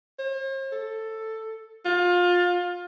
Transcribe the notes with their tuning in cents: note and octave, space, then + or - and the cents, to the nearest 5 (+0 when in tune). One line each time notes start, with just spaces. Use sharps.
C5 +45
A4 +10
F4 +25